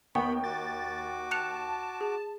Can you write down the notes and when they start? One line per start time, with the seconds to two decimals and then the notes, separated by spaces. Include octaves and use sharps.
0.15 D#2 B3 G5 B5 C#6
0.44 F#4 D6 A6
1.31 A5 F#6 C#7 F7
2.01 G#4